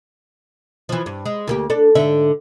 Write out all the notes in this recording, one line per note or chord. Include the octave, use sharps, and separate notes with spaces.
E3 F3
G2
G#3
D2 A#3 G4
D4 A4
G#2 D3 E5